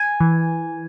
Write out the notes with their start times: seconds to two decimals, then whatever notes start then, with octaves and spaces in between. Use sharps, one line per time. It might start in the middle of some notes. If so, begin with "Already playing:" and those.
Already playing: G#5
0.20 E3